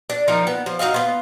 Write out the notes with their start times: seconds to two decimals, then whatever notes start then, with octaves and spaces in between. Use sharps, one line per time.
0.10 D4
0.28 F3 D#4 A#4
0.47 B3
0.66 F3
0.79 D#4 F#4 D#5 F5
0.94 B3 F4